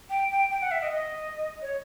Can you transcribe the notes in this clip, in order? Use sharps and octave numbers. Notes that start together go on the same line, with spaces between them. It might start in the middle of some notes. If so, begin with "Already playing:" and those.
G5
G5
G5
F#5
E5
D#5
D#5
C#5